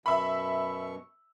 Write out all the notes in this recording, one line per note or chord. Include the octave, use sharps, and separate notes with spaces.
F#2 B2 E5 B5 C#6